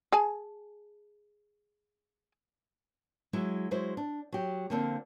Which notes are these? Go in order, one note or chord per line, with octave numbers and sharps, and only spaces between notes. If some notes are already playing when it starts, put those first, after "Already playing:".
G#4 G#5 A5
F#3 G#3 E4
F#3 G#3 E4 C5
D4
F#3 G4
D3 F3 A#3 C4 D4